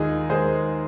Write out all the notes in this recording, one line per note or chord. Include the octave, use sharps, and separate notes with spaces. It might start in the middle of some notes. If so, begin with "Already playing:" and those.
Already playing: D#2 D#3 G#3 D#4 F4 G#4
D#2 D#3 G#3 G#4 C5